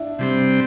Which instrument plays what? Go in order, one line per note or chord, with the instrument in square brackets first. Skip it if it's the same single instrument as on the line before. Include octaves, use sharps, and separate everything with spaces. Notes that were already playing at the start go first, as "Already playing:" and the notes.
Already playing: [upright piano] D4 E4
[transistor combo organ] C3 G3 C4